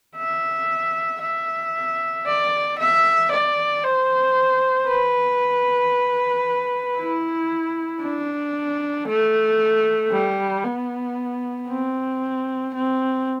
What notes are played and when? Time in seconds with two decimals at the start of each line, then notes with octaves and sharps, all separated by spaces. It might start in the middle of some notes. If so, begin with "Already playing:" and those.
0.17 E5
1.22 E5
2.26 D5
2.79 E5
3.31 D5
3.83 C5
4.88 B4
6.97 E4
8.02 D4
9.08 A3
10.12 G3
10.64 B3
11.69 C4
12.74 C4